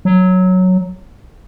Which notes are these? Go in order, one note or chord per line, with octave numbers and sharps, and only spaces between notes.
F#3